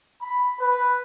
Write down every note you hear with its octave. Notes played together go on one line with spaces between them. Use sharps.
B5
B4